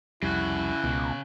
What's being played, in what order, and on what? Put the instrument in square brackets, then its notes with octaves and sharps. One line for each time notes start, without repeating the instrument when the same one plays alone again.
[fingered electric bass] C2 F2 G3 [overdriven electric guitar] C#3 F#4 [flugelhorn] E4
[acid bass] C#2 [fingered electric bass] B2